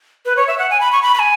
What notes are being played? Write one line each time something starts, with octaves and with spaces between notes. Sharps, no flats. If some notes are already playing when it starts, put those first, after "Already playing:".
B4
C#5
E5
F#5
G#5
B5
C#6
B5
B5
G#5